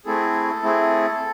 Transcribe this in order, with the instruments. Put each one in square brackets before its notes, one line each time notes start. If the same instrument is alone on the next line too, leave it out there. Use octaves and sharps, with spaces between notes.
[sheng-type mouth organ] A3 C4 E4 G#4 A4
A3 C4 E4 G#4